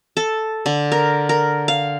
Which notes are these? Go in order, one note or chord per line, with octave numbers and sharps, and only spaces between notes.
A4
D3
A#4
A#4
F5